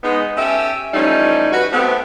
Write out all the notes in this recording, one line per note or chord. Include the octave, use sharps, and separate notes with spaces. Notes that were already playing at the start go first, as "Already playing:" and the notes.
G#3 B3 D#4
C#4 G4 A4 E5
E3 F3 G3 A3 C#4 D#4
F#4 B4
A3 B3 C4